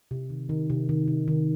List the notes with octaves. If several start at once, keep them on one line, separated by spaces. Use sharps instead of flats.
C3
D#3
D#3
C3
D#3
C3
D#3